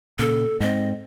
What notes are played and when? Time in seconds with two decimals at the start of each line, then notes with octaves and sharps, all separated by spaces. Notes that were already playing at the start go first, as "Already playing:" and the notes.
0.19 A#2 C#3 A4
0.60 G#2 C4 D#5